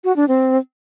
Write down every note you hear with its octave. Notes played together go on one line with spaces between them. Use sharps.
F#4
D4
C4